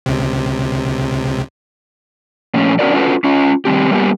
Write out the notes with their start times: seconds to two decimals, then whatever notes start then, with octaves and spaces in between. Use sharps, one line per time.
0.06 C#2 C3
2.54 A#2 F3 A3 C#4
2.79 C#4 D4 F#4 A#4 D5
2.94 C#4 F4 F#4 A4 B4
3.24 C#4 F4
3.65 D#3 G3 C4 G4
3.91 G3 A#3 B3 G4